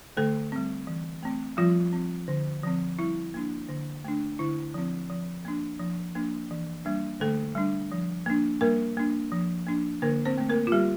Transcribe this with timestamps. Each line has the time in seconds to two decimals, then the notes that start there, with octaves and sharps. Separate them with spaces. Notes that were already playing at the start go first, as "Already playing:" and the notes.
0.17 D3 A3 A4
0.52 G3 C4
0.87 E3
1.23 A3 C4
1.57 F3 G3 F4
1.93 C4
2.28 D3
2.63 F3 C4
2.99 G3 E4
3.34 A#3 D4
3.69 D3
4.05 A3 D4
4.39 D3 E4
4.74 F3 C4
5.10 F3
5.45 A#3 D4
5.80 F3
6.15 A#3 D4
6.51 E3
6.85 G3 A#3 D4
7.20 D3 A3 A4
7.55 G3 D4
7.92 F3
8.26 A#3 D4
8.61 G3 A#3 A#4
8.97 A#3 D4
9.32 F3
9.66 A#3 D4
10.02 D3 A#3 A#4
10.25 C4 C5
10.38 A3 C4
10.49 A#3 A#4
10.67 F4
10.72 G3 G4